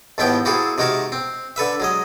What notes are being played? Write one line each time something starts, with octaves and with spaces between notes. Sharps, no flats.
D#2 G#2 F3 B3 E4 G5
A#3 C4 E4 F#4 G#4 A4
C3 D#3 G#3 F#4 A#4 A5
C4
D3 A4 B4 E5
F#3 G#3 D#5